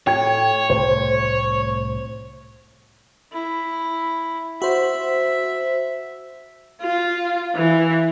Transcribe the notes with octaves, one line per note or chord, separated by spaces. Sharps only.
A2 C#5 G5 G#6
C2 A2 A3 C5
E4
F#4 C5 E5
F4
E3